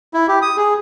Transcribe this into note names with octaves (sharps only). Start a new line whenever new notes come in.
E4
G4
D#6
G#4